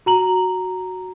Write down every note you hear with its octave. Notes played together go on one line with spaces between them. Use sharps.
F#4 A#5 F#7